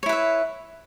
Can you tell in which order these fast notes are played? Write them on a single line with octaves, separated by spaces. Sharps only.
C#5 E4 B4 E5